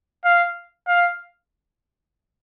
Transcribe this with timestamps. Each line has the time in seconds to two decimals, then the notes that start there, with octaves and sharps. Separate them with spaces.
0.24 F5
0.88 F5